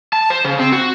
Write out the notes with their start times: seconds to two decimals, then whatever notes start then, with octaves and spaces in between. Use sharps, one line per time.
0.13 A5
0.30 C5
0.44 C#3
0.59 C4
0.72 F#4